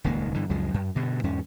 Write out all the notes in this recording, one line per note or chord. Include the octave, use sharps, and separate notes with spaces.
D#1 C#2 D#3 A#3
G2 D3 E3
C#2 F#2 F3 G#3
F#2
G2 B2 D3
E2 G#2 C#4